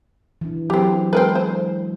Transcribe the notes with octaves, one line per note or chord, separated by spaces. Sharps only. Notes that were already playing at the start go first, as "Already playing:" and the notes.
E3 D4
F#3 C4 G4
G#3 C4 A#4 B4
C5